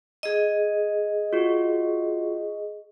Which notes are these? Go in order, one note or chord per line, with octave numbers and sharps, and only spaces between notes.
G#4 D#5
F4 F#4